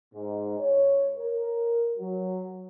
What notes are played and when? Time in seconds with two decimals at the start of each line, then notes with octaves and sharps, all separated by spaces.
0.14 G#2
0.60 C#5
1.17 A#4
1.98 F#3